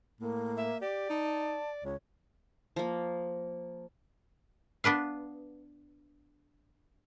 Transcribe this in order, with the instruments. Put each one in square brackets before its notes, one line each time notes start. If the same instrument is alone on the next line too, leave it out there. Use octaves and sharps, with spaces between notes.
[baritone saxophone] A2 [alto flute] A#3
[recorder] E5
[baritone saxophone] G4 [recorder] D5
[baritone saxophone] D#4 [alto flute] A5
[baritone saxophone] C#2 [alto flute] C#5
[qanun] F3 A#3
[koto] B3 D4 B4 F5